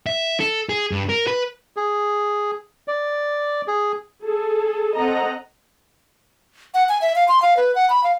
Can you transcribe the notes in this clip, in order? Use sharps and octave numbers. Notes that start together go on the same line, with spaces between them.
E5
A4
G#4
G2
A#4
B4
G#4
D5
G#4
G#4 A4
C4 A4 D#5 F#5 A#5
F#5
G#5
E5
F5
C6
F5
B4
F#5
B5
F5